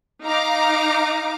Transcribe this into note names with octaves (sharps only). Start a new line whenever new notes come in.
D#4 F5 A#5 D6